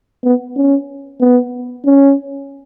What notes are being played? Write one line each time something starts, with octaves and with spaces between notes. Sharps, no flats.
B3
C#4
B3
C#4